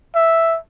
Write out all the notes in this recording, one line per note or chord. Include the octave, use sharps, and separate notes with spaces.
E5